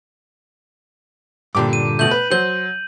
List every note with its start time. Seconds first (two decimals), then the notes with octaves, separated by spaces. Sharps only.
1.55 G2 A#2 D3 G4 D6
1.73 D#7
1.99 B2 A3 G6 F#7
2.11 B4
2.32 F#3 C5 G6